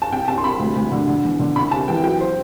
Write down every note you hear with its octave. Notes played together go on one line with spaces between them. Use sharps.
A5
C2 G5
C2 A5
C6
C2 B5
D2
D2
D3
D3
E2
D3
C2 B5
C3 A5
E3 G5
F#3 G5
C5